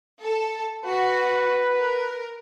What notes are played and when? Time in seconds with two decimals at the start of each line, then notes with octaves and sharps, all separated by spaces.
0.22 A4
0.85 F#4 B4
1.76 A#4